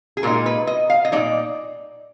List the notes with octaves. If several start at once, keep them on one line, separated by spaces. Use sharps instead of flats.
G#4
A#2 G#3 D#4 A#4
B4
D#5
F5
D#5
A#2 G#3 D#4 D5